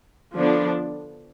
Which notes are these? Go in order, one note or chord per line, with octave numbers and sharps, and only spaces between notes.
D3 F3 B3 D4